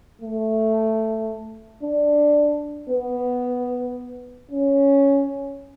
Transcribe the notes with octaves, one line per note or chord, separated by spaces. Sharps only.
A3
D4
B3
C#4